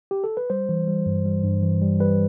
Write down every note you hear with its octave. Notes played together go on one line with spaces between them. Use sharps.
G4
A4
B4
G3 C5
E3
G3
G2
G3
G2
E3
G3
G3 B4